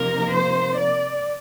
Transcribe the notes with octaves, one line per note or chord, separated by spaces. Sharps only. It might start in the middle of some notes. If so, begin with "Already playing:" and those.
Already playing: C3 F3 A#3 D#4 A#4
C5
D5